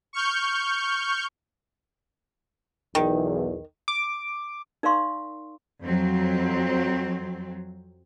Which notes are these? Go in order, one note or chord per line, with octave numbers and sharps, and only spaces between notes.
C#6 F6 G6
B1 E2 D#3
D6
D#4 A#4 D5 F5 C6 C#6
F2 F#3 C4